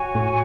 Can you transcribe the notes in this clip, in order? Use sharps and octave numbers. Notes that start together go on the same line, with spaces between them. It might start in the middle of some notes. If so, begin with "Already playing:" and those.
Already playing: F#4 C#5 G#5 C#6
A2